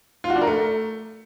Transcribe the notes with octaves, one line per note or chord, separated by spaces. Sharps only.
F4
F#4
D4
A#4
A3